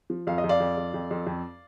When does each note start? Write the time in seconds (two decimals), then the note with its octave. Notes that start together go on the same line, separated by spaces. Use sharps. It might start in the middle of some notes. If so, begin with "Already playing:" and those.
0.10 F3
0.27 F2 F5
0.38 D#5
0.44 F2
0.49 D5 F5
0.60 F2
0.77 F2
0.94 F2
1.11 F2
1.27 F2